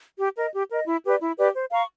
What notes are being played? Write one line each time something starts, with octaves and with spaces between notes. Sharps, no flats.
G4
A#4 D#5
G4
A#4 D#5
E4
G4 B4 D5
E4
G4 B4 D5
C5
F5 A#5 C#6